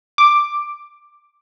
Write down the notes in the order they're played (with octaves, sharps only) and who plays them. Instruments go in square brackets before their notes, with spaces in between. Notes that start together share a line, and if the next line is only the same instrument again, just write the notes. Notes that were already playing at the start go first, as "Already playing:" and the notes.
[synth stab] D6